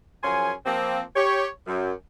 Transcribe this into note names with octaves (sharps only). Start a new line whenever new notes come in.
F#2 F3 C#4 G#4 G#5 C6
F3 A#3 C4
G4 C#5
F#2